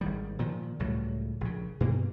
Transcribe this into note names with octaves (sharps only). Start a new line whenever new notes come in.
G#1 D#3 G3
A#2 D#3 F3
C#2 A2 F#3 G3
A#1 C#3
G2 B2 A#3